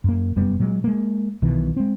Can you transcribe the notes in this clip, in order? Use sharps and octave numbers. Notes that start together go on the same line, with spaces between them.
F#2 A#3
F1 F#2 G3 B3
A#2 F#3 G#3
G#3 A#3
B1 B2 D#3 E3
G#3 C4